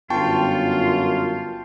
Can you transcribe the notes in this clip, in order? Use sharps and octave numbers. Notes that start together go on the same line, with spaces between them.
G1 F#2 F4 G5 A5 C#6